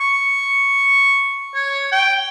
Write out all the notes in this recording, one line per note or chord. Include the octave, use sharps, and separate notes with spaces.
C#6
C#5
G5